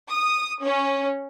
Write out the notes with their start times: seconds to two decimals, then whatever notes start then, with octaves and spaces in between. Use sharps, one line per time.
0.11 D#6
0.62 C#4